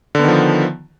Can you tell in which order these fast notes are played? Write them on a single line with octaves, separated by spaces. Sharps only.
D3 B3 D#3 F3